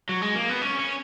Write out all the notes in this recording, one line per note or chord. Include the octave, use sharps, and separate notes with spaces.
F#3
G#3
A#3
B3
C#4
C#4